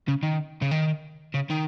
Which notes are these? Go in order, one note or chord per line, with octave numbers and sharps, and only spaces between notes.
C#3
D#3
C#3
D#3
C#3
D#3